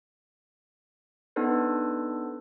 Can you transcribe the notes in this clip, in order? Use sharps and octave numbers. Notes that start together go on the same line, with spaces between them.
B3 D4 D#4 A4 B4 C5